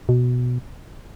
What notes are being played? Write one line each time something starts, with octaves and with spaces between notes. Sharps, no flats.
B2